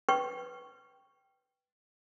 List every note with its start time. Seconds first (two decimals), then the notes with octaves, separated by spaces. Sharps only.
0.09 B4 G5 C#6